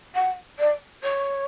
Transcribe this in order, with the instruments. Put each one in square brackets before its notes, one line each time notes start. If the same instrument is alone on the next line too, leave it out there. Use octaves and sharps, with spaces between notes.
[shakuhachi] F#5
D5
C#5